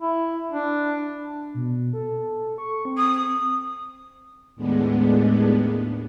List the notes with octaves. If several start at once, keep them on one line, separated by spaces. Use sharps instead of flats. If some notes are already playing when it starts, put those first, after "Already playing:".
E4
D4
B2
A4
C#6
C4
D#6
D#2 A2 G#3 B3 D4